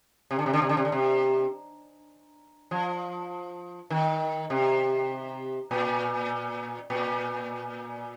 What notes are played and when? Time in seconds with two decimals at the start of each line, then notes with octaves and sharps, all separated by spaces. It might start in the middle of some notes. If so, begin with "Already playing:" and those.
0.31 C3
0.39 D3
0.46 C3
0.53 D3
0.62 C3
0.69 D3
0.77 C3
0.85 D3
0.92 C3
2.71 F3
3.90 D#3
4.50 C3
5.71 A#2
6.90 A#2